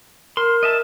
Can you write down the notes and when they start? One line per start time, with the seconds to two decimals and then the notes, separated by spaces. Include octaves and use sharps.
0.37 A#4 C6
0.63 D#5 E5 A5